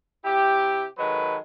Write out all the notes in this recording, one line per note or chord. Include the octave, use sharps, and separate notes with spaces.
C3 E4 G4
D#3 F#3 G#3 A4 B4